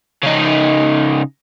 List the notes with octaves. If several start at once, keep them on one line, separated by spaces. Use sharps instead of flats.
C#3 D#4